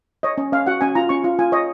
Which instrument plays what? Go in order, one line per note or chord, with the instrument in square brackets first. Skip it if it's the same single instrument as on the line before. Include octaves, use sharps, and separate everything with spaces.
[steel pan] C#5 D#5
C#4
C#4 F5
F#4 F#5
C#4 G#5
F4 A#5
C#4 C#6
F4
F4 G#5
C#5 D#5